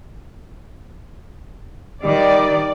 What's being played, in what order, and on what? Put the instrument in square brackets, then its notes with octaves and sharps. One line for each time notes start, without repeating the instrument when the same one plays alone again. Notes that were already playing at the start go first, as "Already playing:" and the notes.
[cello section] D#3 [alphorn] G3 [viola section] D5